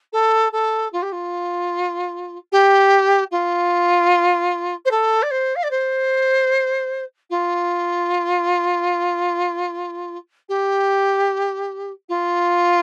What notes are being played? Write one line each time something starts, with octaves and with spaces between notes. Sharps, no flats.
A4
A4
F4
G4
F4
G4
F4
C5
A4
D5
C5
F5
D5
C5
F4
G4
F4